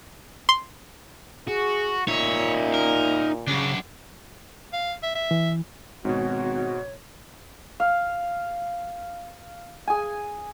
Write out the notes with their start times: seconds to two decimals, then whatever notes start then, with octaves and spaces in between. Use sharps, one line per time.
0.49 C6
1.48 F#4 G#4
2.08 A#2 D#4 C#5 E5
2.74 A#4
3.48 F#2 C#3 D4
4.73 F5
5.03 E5
5.15 E5
5.31 E3
6.05 G#1 G#2 B2 F#4 C#5
7.80 F5
9.88 G#4 G#5